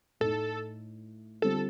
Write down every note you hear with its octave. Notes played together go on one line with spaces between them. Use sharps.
A2 A3 D#4 A4
D3 G3 C4 F4 A4